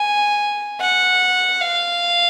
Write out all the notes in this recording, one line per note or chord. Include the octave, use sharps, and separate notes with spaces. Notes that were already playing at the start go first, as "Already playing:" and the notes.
Already playing: G#5
F#5
F5